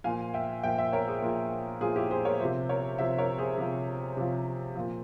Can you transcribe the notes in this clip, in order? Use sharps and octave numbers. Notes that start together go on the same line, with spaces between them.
A#2 F3 F5 G#5
E5 G5
A#2 F3 E5 G5
C5 E5
A#4 C#5
G#4 C5
A#2 F3
A#2 F3 F4 G#4
E4 G4
G#4 C5
A#4 C#5
C3 F3 C5 E5
A#4 C#5
C3 F3 C5 E5
A#4 C#5
G#4 C5
C3 F3
C3 F3
A#2 F3